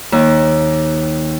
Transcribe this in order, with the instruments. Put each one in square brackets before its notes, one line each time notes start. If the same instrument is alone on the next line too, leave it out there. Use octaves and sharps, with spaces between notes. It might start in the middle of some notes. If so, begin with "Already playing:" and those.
[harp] D#2